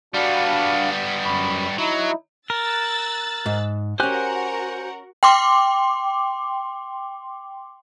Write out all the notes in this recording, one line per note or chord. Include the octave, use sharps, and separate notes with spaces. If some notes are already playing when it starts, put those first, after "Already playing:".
G3 B3 D4 F#4 F5
F#2 B5 C#6
F#3 D#4 E4
A#4 E6 F#6 A6
G#2
C#4 F#4 G4 A#4 C5 F#5 G#5 F#6
G5 C6 D6